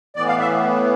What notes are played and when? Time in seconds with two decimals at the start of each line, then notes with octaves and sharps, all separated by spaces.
0.16 A2 E3 B3 D5
0.28 F5
0.39 E5